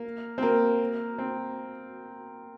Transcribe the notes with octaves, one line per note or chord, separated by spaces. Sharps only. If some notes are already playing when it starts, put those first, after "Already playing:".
Already playing: A#3
C4
A#3
C4